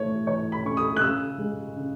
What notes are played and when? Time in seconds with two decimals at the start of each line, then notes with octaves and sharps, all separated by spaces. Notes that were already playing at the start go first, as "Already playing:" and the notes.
Already playing: E3 A3 C#5
0.27 E3 C#5
0.52 B5
0.65 C#4 C#6
0.77 D#6
0.97 F#6
1.01 C#3 E6
1.38 G#3
1.76 C#3